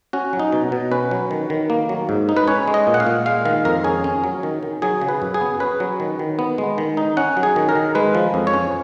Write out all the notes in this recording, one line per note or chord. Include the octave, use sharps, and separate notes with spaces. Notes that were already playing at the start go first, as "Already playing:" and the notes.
C#4 F#4
F#3
D#4
B2
B2
C#4 B4
F#3
D#3
D#3
A#3
F#3
G#2
D#4
B4
C#4 C#5
G#3
D#5
A#2
F#5
F5
A#2
G#3 F5
D#3 F5
F2 A#4
C#4 G#4
C#4
F#3
D#3
D#3
F#3 G#4
C#3
B4
F#2
G#4
B3
C#4 B4
F#3
D#3
D#3
B3
G#3
D#3
D#4
C#4 F#5
F#3
G#4
D#3
A#4
D#3
G#3 B4
F3
F2
C#5
C#4